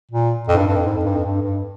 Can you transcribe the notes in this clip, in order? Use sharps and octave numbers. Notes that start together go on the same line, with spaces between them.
A#2
F2
G#2
G2
G2
F2
G#2
F2
G2
F2
G2
G2